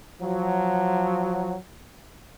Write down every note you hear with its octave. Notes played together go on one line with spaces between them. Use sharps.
F3 F#3